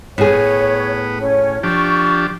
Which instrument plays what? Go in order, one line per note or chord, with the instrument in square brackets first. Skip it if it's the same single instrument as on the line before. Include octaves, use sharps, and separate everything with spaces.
[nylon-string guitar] A2 G#4 [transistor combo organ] B3 [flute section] C#5
[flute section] C#4 C#5
[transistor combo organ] F3 D4 G4 [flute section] C#6